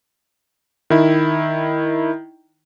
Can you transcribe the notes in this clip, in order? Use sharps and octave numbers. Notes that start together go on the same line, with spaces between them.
D#3 E4